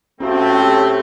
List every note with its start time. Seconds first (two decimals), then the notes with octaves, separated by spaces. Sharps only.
0.20 A2 A3 C4 C#4 F#4 F5
0.61 G4